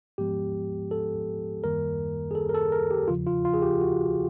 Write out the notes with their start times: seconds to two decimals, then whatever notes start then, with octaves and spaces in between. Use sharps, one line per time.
0.18 G#2 F3 G#3 B3 G4
0.91 A4
1.64 F#2 D#3 G3 A#3 A#4
2.31 G#4
2.35 A4
2.49 A#4
2.54 A4
2.72 A#4
2.91 G4
3.08 E2 C#3 F3 F4
3.27 F4
3.45 F4
3.54 G#4
3.62 G4
3.81 F#4